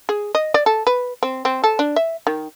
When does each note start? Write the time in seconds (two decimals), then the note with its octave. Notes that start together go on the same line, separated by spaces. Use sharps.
0.09 G#4
0.35 D#5
0.54 D5
0.66 A4
0.87 B4
1.23 C4
1.45 C4
1.64 A4
1.79 D4
1.96 E5
2.27 D#3